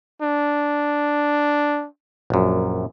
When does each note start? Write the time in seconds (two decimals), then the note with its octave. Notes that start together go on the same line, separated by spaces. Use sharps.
0.22 D4
2.30 A#1 F#2